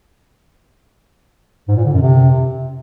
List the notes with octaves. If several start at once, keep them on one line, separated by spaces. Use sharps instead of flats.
G#2
A#2
D3
F#2
C3